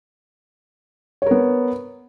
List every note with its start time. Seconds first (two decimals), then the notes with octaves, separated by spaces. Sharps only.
1.22 C#5
1.26 A#4
1.31 B3